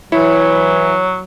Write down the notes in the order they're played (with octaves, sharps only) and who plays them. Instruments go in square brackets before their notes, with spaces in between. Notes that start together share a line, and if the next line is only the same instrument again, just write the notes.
[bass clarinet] E3 [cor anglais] F#3 [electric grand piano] E4 [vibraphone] C#5